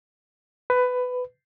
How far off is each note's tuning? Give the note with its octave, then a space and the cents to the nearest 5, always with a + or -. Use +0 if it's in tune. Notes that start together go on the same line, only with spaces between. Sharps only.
B4 +15